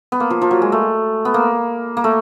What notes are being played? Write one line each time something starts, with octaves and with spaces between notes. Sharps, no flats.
B3
A#3
F3
F3
F#3
G#3
A3
B3
A#3
A#3
A3